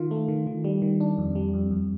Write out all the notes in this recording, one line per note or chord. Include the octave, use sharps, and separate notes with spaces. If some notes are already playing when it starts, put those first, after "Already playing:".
Already playing: D#3 F4
A3
D#3
D#3
G3
D#3
D4
F2
G3
F2
F2